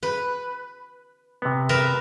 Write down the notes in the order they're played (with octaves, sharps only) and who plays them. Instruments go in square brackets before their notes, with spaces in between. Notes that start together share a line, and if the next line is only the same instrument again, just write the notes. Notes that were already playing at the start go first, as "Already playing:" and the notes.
[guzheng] B4
[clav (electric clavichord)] C3 B3
[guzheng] A#4 B4 E5